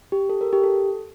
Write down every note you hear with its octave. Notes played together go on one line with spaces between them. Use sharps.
G4
A4
A#4
G4
A4